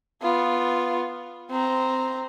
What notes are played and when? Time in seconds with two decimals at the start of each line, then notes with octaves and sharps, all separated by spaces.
0.22 B3 F4
1.50 C4 A#5